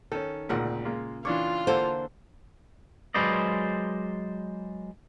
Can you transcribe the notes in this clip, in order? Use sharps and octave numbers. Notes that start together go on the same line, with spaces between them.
D#3 C#4 A4
G#1 D2 A#2 C#3 A#4 F#5
G#3 A#3 F4
E3 D4 F4 C#5 D6
D3 A#3 A4 C5
F#3 G#3 B4 C5 D5 D#5